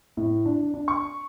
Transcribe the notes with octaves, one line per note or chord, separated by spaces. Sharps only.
A2
D4
D4
C#6